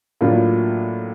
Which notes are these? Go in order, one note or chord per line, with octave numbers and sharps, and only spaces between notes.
A2 F#3 A#3 D4 F4